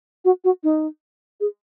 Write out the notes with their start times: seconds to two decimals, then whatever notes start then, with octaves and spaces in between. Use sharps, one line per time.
0.25 F#4
0.44 F#4
0.64 D#4
1.40 G#4